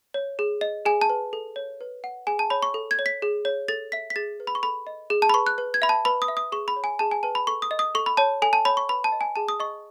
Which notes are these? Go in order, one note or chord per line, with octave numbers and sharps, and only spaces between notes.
C#5
G#4
D#5
G#4 G#5
A5
B4
A4
C#5
B4
F#5
G#4 G#5
A5
C#5 B5
C#6
A4
G#6
C#5
B6
G#4
C#5
A4 A6
E5 B6
B6
G#4 A6
B4
B5
C#6
A4 B5
D#5
G#4
A5
B5
B4 C#6
F#6
B4
G#6
E5 B5
A5
B4 B5
D#6
E5
D#6
G#4 C#6
B5
C#5
G#5
G#4 A5
G#5
B4 A5
B5
A4 C#6
D#6
D#5
D#6
A4 C#6
B5
C#5 A5
A4 G#5
A5
C#5 B5
C#6
B4 B5
A5
D#5
G#5
G#4 A5
D#6
D#5 C#6